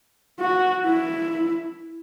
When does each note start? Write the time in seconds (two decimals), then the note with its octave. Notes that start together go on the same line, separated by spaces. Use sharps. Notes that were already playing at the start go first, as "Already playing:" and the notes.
0.40 F#4
0.85 E4